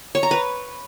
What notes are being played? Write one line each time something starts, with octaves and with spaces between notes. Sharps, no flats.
C#5
A#5
B4